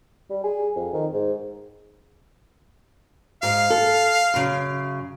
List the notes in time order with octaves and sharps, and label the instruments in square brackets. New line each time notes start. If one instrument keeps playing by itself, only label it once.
[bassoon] G3
G#4
F2
D#3
G#2
[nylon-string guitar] G#2 [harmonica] F5
[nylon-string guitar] A4
F#2 C#3